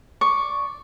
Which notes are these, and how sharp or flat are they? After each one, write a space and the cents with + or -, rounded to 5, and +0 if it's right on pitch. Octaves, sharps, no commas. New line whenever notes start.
D5 -5 C#6 +0